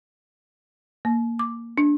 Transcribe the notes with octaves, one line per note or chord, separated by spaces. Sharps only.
A#3
D6
D4